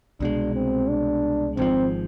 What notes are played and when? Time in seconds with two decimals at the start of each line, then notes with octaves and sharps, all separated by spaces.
0.20 C2 B2 G#3 D4
0.55 C4
0.89 D4
1.57 G#1 G#2 F3 C4